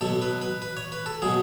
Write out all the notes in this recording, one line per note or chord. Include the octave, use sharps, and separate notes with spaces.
B2 F#3 A4
B4
B4
B4
C#5
B4
A4
B2 F#3 G#4